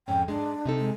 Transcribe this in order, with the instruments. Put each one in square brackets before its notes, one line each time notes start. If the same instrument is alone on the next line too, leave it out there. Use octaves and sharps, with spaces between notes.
[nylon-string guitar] F2 G#2 C#4 [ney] G5
[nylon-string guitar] G#2 G#3 [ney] D4
[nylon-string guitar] C3 D#4 A4
[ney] G#3